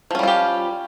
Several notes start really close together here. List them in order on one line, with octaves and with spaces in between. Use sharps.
F3 C#4 G3 F4 G4